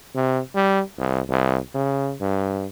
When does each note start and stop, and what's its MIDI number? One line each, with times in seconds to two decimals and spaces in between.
0.15 0.40 48
0.55 0.82 55
0.98 1.21 36
1.30 1.58 36
1.75 2.15 49
2.21 2.66 43